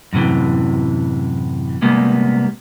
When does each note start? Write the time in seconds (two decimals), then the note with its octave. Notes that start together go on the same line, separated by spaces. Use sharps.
0.13 F#2 A2 C3 E3
1.82 C3 G3 G#3 A#3 B3